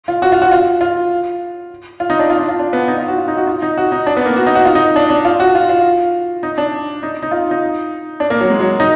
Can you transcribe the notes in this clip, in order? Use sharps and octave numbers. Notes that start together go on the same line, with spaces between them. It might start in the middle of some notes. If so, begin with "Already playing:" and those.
F4
F#4
F4
F#4
F4
F4
F4
D#4
D4
F4
D4
F4
D4
B3
D#4
F4
F#4
F4
D#4
F#4
F4
D#4
F#4
D#4
D4
B3
A#3
F#4
D#4
F#4
F4
D#4
D4
D4
F4
F#4
F4
F4
D#4
D4
D#4
D#4
F4
D#4
D4
A#3
F#3
G#3
F#3
D#4